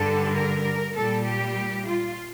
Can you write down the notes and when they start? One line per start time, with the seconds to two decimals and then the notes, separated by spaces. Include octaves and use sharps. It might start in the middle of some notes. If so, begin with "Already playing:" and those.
Already playing: G2 D3 G3 A4
0.33 A#4
0.94 A#2 G3 A4
1.24 G4
1.85 F4